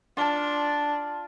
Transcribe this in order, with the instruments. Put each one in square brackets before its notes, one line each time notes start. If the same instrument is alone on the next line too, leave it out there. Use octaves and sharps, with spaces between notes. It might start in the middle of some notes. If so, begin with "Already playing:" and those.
[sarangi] D4 [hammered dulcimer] F4 A5